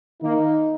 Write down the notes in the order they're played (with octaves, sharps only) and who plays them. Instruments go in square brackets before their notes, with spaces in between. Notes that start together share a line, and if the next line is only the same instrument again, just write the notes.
[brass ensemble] D#3 A#3 D#4